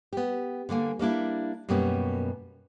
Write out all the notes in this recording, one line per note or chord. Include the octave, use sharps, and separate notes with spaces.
B3 G4
D3 G3 A#3 G#5
G3 A#3 D4 E4
F#2 B2 G3 A#3 B3 C#4